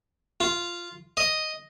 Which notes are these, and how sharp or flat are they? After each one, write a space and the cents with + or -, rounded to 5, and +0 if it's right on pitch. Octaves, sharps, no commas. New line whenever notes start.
F4 -5
D#5 +0